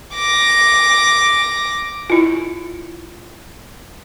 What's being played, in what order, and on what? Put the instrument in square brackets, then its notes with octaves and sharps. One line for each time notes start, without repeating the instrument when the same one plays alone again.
[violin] D6 A#6
[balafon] E4 F4